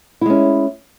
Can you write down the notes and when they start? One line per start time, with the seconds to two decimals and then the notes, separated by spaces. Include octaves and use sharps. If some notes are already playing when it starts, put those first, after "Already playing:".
0.21 E4
0.26 G#3
0.30 C#4